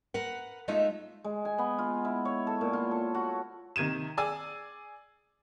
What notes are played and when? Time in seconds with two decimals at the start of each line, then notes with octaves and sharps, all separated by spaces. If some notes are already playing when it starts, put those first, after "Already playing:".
0.14 A#4 B4 F#5
0.68 G#3 A3 D#4 F4 D#5 E5
1.24 G#3
1.45 G#5
1.58 B3
1.79 F4
2.05 E4
2.25 C#5
2.47 A4
2.61 A#2
2.73 F4
2.91 A4
3.15 F#4
3.76 C3 D#3 G#6 D#7 E7
4.17 G#4 D5 G#5 E6